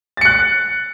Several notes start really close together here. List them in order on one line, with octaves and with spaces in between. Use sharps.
A6 C#7 F#6